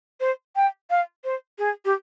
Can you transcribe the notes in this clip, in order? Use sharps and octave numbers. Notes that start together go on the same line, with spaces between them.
C5
G5
F5
C5
G#4
G4